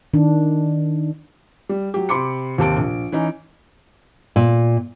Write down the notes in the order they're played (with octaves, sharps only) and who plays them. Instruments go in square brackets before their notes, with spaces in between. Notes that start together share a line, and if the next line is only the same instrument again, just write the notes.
[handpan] D#3 D4
[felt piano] G3
F#3 G4
C3 B5 C6 D6 C#7
D#2 C3 A5 D7
A#1
E3 C#4 D#4
[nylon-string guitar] A#2